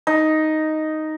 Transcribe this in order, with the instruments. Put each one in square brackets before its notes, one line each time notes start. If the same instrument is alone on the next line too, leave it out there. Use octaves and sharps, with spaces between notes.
[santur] D#4